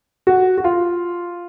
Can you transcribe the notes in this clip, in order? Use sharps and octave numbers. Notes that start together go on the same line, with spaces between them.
F#4
F#4
F4